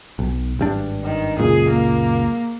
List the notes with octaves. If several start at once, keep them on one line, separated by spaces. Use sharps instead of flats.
B1
G#1 G2 D4
D#3
C#2 F#2 A#2 G#4
A#3